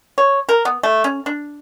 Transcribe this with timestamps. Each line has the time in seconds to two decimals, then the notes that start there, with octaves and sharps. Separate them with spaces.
0.18 C#5
0.49 A#4
0.65 B3
0.83 A3
1.04 C#4
1.26 D4